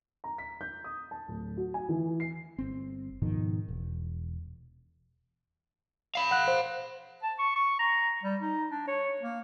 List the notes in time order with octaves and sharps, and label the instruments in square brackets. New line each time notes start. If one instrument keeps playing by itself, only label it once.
[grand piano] A#5
B6
G6
D#6
A5
D1
F#4
G#5
E3
C7
[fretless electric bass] G1 C4
G#2 B2 D#3 F3
E1
[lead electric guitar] F5 B5
[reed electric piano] F#5 F#6
C5
[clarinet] A5
C#6
C#6
A#5
G3
D#4
D4
C#5
A#3